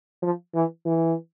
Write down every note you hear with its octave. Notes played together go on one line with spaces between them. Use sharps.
F3
E3
E3